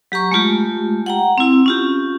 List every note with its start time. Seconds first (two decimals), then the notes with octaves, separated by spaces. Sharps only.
0.12 F#3 G4 A#5 C#6
0.32 G#3 A3 F4 G4
1.06 F#5 G5 A#5
1.38 C4 E4
1.66 C#4 F4 G4